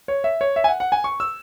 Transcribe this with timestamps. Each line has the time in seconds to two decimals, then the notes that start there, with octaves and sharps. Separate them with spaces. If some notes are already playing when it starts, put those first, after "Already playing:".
0.08 C#5
0.24 E5
0.41 C#5
0.56 E5
0.64 G#5
0.68 F#5
0.80 F#5
0.92 G#5
1.04 C#6
1.20 E6